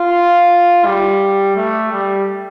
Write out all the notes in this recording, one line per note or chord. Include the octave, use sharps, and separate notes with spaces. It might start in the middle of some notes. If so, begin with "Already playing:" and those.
Already playing: F4
G3
A3
G3